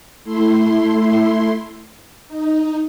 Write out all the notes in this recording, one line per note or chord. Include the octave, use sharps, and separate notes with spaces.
A3 E4 C6
D#4